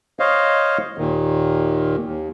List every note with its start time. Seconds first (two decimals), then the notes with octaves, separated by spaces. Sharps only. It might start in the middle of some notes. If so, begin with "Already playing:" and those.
0.19 C5 C#5 D#5 F5
0.98 D#2 A#2 D#3
2.04 D#2